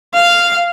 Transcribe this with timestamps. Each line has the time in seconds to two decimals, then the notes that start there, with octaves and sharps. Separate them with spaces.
0.14 F5